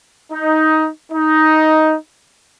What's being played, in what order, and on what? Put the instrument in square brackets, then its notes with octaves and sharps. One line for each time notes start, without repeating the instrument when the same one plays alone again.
[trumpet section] D#4
D#4